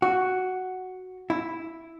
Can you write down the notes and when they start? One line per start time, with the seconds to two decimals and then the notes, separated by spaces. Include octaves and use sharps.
0.02 F#4
1.30 E4